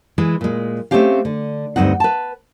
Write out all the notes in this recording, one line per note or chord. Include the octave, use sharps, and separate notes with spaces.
E3 G#3
A#2 G#3
A3 A#3 C4 C#4 G4 F5
D3
D2 G2 E3 C4 D#4 F#5
B4 A5